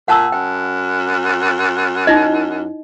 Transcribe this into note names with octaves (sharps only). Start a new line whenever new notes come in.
A#2 F#5 A5 E6
F#2 G5
D#4 E4 D#5